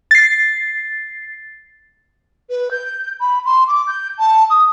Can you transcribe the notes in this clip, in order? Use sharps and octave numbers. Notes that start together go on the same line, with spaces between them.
A6 C7
B4
G6
B5
C6
D6
G6
A5
D#6